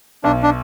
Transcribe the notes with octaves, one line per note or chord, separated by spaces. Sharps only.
B1 D4
D4